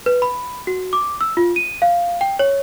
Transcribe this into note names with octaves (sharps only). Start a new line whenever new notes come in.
B4
B5
F#4
D6
E6
F4
D#7
F5
G5
C#5